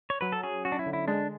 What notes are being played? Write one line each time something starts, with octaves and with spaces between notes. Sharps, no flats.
C#5
F#3 B4
A4
C#4 G#4
C#4 F#4
D4
E4
D3
E4
G#3 D4